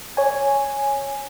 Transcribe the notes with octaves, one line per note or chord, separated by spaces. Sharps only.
C#5 G#5